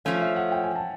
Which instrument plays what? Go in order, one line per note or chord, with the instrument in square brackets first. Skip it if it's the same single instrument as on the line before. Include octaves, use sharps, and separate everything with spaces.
[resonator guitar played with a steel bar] F3 A3 C#4 [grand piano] F5
[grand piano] E5
F#5
G5
G#5
A5